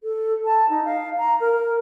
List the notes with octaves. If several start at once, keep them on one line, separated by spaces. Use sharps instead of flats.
A4
A5
D#4
F5
A#5
A#4